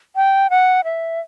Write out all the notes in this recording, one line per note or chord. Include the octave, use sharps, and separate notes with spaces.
G5
F#5
E5